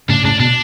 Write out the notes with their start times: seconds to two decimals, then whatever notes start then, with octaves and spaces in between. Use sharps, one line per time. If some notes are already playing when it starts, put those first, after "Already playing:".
0.09 A2 C#3 D4
0.24 A2 C#3 D4
0.40 B2 D4